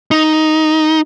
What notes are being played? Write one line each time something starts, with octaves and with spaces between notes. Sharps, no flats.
D#4